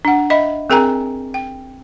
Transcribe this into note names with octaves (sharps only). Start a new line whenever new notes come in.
D4 F#5
D#5 E5 B5
C4 G#4 A#4 G5 G#5 A#5
G5